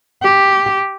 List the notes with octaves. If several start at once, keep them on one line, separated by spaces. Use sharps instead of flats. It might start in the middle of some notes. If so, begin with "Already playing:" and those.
G4